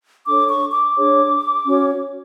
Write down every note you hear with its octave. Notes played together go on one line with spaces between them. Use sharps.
D4 A4 C#5 D6
C#6
D6
D4 G#4 C#5
C#4 F#4 C#5